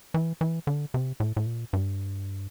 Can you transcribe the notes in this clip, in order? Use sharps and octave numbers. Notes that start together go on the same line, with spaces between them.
E3
E3
D3
C3
A2
A2
A#2
G2